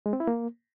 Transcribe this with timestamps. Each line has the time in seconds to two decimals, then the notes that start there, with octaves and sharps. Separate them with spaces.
0.06 G#3
0.13 C4
0.20 E4
0.27 A#3